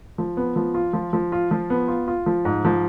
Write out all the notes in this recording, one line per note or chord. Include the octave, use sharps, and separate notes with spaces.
F3
B3
F3
F4
F3
F3
F4
F3
B3
F4
F4
F3
G#2
F3